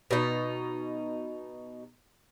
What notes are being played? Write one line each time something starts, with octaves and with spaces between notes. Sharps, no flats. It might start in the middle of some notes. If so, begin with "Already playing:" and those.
B2 D#4